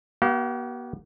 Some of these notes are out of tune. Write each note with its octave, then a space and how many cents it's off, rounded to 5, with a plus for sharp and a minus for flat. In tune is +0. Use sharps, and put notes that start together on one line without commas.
B3 -45 G4 -45 F5 +0